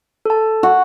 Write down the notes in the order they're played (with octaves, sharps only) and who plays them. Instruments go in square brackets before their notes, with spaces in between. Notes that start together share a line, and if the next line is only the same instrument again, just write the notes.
[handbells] A4 A5
[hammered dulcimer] F#4